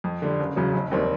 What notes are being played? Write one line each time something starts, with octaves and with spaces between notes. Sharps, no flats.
F2
D3 G3
F#1
E2 C#3 F#3
F1
D#2 D#3 G3 C4